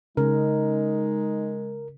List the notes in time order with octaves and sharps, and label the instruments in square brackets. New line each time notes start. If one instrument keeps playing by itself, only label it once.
[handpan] C#3 [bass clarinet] G#3 [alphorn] D#4 [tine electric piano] A#4